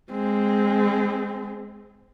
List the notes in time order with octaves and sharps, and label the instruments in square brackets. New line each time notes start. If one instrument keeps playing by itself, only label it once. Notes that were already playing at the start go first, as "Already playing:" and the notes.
[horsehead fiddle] G#3 C4